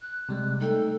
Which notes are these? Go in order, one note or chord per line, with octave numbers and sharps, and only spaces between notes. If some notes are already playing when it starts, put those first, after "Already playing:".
F#6
C3 G3 G#3
A3 D#4 A4 G5